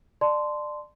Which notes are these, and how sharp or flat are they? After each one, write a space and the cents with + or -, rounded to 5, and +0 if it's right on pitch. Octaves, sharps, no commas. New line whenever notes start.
D5 +25 A5 -10 C6 -10